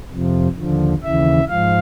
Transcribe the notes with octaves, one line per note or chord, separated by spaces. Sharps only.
F2 C3 F3
D#2 D3 F3
D#2 C#3 E3 E5
G#2 F3 F5